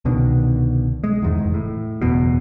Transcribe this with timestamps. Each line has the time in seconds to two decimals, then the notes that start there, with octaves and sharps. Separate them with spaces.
0.05 C2 B2 D3 D#3
1.04 G#3
1.22 E2 G#2 D#3
1.39 F1
1.54 A2
2.01 F#1 E2 B2